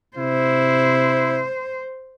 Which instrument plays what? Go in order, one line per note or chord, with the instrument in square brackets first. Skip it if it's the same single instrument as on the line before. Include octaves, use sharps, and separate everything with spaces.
[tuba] C3 [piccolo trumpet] E4 [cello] C5